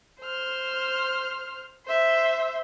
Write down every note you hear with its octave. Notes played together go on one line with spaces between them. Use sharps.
C5 F6
C5 E5